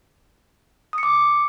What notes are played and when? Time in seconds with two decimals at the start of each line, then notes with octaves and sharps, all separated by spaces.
0.93 D#6
0.98 C#7
1.03 D6